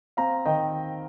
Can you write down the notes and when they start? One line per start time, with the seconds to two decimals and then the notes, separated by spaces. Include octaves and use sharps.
0.17 C4 F5 A#5
0.46 D#3 D#5 G5